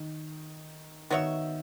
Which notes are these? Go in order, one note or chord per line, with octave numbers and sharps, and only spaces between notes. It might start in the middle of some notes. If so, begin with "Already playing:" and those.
Already playing: D#3
D#3 B3 F#4 C#5 E5